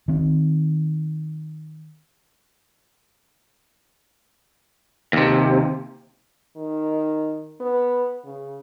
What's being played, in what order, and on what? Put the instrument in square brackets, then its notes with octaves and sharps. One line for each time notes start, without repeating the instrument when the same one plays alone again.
[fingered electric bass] D#3 C4
[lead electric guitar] D#2 C3
[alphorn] D#3
B3
C#3